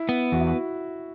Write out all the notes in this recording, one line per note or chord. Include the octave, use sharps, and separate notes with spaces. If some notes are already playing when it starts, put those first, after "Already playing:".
Already playing: E4
B3
E2 F#4
E4
F#4